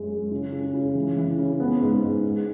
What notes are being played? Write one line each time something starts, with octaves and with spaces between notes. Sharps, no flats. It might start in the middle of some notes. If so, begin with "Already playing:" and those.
Already playing: F#2 G#3
G#3
C#3
C#3
C#3
E3
E3
C#3
B3
G#2
G#2
G#3